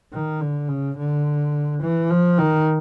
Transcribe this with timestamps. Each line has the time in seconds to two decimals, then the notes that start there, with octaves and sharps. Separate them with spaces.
0.12 D#3
0.40 D3
0.68 C#3
0.98 D3
1.81 E3
2.10 F3
2.38 D#3